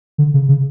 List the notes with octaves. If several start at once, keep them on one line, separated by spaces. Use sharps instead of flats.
D3
C#3
C#3